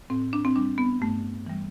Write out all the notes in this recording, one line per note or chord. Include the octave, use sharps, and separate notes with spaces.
A2 C4
D4
C4
G3 D4
B3
G2 A3
E3 G3